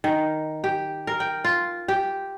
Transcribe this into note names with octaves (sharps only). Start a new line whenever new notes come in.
D#3
G4
A#4
G5
F4
G4